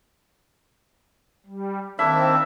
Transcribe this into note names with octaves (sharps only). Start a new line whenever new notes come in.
G3
D#3 A#3 C4 D4 E4 E5